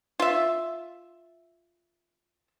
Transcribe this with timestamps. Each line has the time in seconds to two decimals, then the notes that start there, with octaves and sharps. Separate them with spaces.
0.20 F4 E5